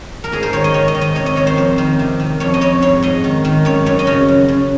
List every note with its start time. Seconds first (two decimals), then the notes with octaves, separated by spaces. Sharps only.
0.24 A#4
0.32 G#2 G#4
0.43 C5
0.53 D#3 C#5
0.64 D#5
0.74 D#3 C#5
0.88 D#5
0.95 D#3
1.01 D#5
1.15 C3 C#5
1.26 D#5
1.36 D#3 C#5
1.47 C5
1.57 F2 C5
1.78 D#3
1.99 C3
2.20 D#3
2.40 F2 C#5
2.54 D#5
2.61 F2 C#5
2.82 G#2 C#5
3.03 G#2 D#5
3.24 D#3
3.45 D#3
3.65 F#2 C#5
3.86 F#2 C#5
3.99 D#5
4.07 C#3 C#5
4.28 F#2
4.48 F#2